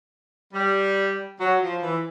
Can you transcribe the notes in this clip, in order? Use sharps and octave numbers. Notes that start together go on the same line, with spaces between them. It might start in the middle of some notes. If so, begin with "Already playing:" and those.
G3
F#3
F3
E3